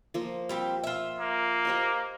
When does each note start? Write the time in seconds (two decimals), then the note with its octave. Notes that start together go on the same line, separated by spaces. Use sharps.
0.14 F3 A#3 C5
0.49 G3 C4 G4
0.84 F4 E5
1.20 A#3
1.65 G4 C5 D#5